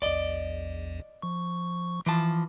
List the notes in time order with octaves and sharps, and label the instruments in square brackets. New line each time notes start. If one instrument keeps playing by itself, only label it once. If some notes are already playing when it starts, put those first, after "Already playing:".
[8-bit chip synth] A#1 E2 [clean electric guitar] D5 D#5
[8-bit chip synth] F3 C#6
[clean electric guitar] E3 F3 A5